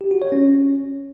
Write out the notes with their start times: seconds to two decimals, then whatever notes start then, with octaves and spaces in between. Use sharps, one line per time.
0.01 G4
0.11 F#4
0.22 C#5
0.32 C#4